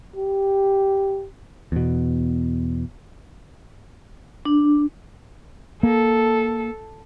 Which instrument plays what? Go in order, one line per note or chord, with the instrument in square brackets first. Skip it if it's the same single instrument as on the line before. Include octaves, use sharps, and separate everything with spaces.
[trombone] G4
[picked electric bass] E2 B2
[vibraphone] D4
[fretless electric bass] A#3 [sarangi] A4